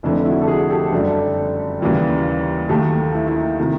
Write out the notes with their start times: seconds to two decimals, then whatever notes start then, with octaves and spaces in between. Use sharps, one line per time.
0.03 F1 F2 D3 E4
0.25 E4 F#4
0.42 A4
0.47 F#4 G#4
0.69 G4 A4
0.92 F#1 F#2 D3 G3
1.80 D#2 C#3 E3 G3
2.69 D#2 D#3 F#3 A3 G4 A4
3.14 E4
3.27 E4
3.36 D#4
3.58 C3 D#3 E4